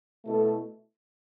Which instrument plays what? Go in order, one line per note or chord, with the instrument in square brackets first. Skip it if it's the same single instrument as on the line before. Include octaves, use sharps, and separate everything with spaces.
[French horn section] B2 A3 E4 A4